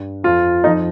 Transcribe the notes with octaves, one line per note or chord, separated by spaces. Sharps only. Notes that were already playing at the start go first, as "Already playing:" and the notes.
Already playing: G2
F2 F3 F4
F2 F3 D#4